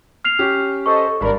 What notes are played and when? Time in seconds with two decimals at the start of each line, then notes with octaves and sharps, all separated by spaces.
0.25 F6 C7 F7
0.39 C#4 G4
0.86 A4 C5 D#5 C#6
1.21 G#1 G2 A#4 D5 B5